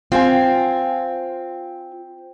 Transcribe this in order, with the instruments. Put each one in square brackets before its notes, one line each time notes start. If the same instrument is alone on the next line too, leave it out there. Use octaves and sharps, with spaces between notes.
[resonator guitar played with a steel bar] C4 [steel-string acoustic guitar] F4 G#5